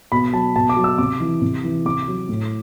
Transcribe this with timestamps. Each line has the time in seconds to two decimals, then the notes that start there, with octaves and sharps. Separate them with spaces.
0.12 B2 B5
0.33 F#3 A5
0.56 B2 A5
0.69 D6
0.77 F#3
0.84 E6
0.98 C3 D6
1.20 E3
1.42 C3
1.64 E3
1.85 C3 D6
2.08 F#3
2.29 A2